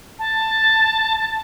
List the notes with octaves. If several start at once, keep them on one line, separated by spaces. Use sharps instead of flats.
A5